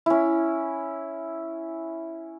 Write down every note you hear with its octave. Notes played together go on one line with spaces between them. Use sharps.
C#4 E4